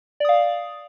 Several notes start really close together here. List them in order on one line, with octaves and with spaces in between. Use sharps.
D5 D#6 F5